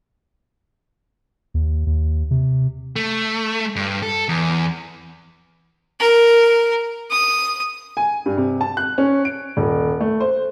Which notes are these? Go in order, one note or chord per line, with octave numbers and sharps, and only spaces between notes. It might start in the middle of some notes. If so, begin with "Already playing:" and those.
D#2
D#2
C3
A3
G2
A4
E2
A#4
D#6
G#5
G2
C3
A5
F#6
C#4
D7
D#1
A3
C5